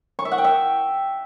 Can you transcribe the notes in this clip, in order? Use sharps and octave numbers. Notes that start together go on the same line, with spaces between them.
C#6
E5
F#5
G5
E5